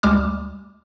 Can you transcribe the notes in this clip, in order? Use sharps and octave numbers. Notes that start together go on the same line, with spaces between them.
D2 G3 G#3 D6 F6